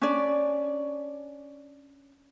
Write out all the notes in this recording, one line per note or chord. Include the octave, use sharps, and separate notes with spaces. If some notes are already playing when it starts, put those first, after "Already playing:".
C#4 D4 D5